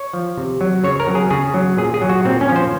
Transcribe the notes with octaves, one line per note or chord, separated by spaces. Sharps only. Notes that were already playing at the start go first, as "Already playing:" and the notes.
Already playing: C#5
F3
C3
F#3
C#3 C#5
A#4
F#3
G#4
C#3 G#4
F#3
A#2 G#4
G#4
F#3
F#4
A#2 C4
C#4
F3
C5